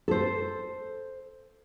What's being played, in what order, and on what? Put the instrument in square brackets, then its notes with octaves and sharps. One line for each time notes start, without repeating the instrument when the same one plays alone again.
[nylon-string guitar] A4 C5